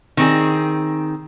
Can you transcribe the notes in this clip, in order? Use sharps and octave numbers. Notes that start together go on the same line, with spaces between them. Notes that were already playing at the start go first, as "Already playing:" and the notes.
D#3 C4 G#4